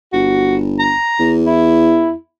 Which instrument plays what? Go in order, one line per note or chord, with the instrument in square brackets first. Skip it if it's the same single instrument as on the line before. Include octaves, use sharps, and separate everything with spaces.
[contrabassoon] G1 [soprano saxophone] F#4
[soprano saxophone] A#5
[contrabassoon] E2
[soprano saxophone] E4